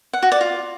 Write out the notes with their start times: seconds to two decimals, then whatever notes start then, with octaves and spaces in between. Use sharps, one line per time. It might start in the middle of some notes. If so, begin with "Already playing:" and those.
0.13 F#5
0.23 F#4
0.32 D5
0.41 F4